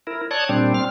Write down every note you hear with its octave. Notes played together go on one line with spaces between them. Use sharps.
E4 A#4
C#5 D5 A5 D#6 F#6 G#6
A#2 G3 C4 D4
C4 F6